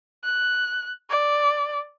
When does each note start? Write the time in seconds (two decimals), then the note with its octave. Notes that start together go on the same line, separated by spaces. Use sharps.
0.24 F#6
1.10 D5